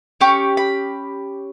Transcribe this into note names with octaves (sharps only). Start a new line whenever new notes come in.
C#4 G4 C#6
B5